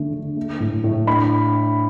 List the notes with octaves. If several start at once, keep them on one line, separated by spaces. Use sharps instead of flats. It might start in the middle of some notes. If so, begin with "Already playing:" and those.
Already playing: D3 A3
D3
A3
A2
A2
D4 B5